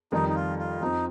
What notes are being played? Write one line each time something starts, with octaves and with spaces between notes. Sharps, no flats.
F2 D#3 G3 D#4
D#4
F4
F4
F2 F3 C4 D#4